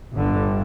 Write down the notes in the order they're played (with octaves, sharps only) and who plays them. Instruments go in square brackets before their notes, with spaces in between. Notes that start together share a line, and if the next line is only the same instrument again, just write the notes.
[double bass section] G1 G2 D3